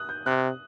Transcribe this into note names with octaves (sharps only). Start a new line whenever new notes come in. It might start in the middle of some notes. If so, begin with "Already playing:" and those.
Already playing: D#6 F#6
G6
C3 F#6